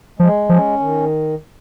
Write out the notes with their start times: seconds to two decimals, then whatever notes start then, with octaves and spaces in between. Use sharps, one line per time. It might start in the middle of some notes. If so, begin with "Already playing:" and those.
0.19 F3 G#3
0.49 F3 C#4
0.80 D#3